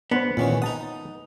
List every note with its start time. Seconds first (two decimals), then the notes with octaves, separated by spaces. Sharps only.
0.11 B3 D4 B4 C5
0.37 D#2 A#2 E3 G#3 C4 C#4
0.62 D#4 F#5 A5 D#6